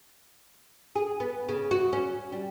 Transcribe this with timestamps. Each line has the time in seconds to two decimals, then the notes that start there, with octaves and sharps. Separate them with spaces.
0.96 G#4
1.20 B3
1.49 C#3
1.71 F#4
1.93 C#4
2.32 G3